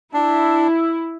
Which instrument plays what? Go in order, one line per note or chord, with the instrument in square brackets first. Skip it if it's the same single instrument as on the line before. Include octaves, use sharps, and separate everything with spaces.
[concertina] D4 [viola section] E4